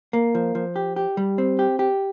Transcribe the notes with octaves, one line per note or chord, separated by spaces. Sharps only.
A#3
F3
F3
G4
G4
G3
C4
G4
G4